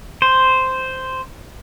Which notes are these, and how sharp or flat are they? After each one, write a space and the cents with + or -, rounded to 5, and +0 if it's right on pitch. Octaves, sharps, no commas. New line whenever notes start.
C5 -5